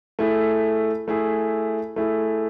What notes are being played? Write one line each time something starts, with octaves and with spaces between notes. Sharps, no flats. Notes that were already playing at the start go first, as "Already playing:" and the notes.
A3 E4 G#4
A3 E4 G#4
A3 E4 G#4